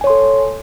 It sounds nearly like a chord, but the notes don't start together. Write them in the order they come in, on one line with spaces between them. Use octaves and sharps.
G#5 C#5 C6 A4